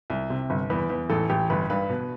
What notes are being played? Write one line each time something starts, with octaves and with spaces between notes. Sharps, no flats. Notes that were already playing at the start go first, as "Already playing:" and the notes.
C2
C3
G1
E2 B4
E2
A1 A4
A1 G4
G1 B4
G2 B4
B2